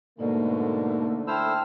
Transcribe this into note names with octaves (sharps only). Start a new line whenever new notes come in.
G#2 B2 D3 A3 A#3 D#4 D5
E4 C5 G5 A5 E6 F6